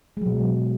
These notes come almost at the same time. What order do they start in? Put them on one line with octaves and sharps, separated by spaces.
G#3 F#3 B2